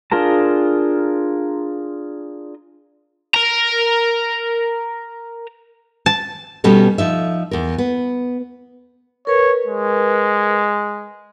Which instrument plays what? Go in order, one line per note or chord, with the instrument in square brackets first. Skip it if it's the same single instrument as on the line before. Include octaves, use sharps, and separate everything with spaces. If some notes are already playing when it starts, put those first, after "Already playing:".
[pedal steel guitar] D4 F4 G#4 A#4 A5
[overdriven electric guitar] A#4 A#5
[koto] A5
[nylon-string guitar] B2 G3 B3 C#4 F#4 A4
F3 D#4 E5
E2 A#4
B3
[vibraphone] A#4 B4 [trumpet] C#5
[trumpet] G#3